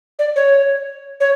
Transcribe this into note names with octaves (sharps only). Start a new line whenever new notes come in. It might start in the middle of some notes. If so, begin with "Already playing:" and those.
D5
C#5
C#5